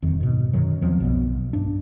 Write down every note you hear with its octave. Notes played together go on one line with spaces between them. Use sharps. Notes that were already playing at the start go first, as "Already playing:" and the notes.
D#1 F2 D#3
G#2 B2
F#2 D#3 F#3
E2 F3 F#3 C4
B1 B2 B3
G2 D4